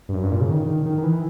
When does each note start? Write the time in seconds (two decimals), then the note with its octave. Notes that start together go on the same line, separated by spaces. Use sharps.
0.09 G2
0.13 F#2
0.23 G2
0.32 A#2
0.41 C#3
0.50 D#3
0.67 D#3
0.86 D#3
0.98 D#3
1.03 E3